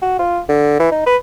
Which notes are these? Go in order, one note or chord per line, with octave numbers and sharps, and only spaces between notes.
F#4
F4
D3
E3
D#4
B4